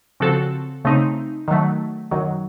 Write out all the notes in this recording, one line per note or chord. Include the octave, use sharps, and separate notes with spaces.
C#3 F3 C4 F#4 A4
C#3 A3 C4 D#4
D#3 F#3 A3
F#2 D#3 F#3